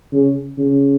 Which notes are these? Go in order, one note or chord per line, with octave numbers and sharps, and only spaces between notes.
C#3
C#3